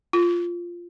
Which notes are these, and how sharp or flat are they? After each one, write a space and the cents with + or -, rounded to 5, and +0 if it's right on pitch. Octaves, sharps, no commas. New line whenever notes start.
F4 -5